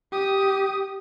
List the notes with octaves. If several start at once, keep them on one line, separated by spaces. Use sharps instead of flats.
G4 D#6